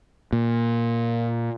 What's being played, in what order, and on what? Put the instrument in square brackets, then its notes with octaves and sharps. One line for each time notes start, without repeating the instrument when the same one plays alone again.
[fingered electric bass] A#2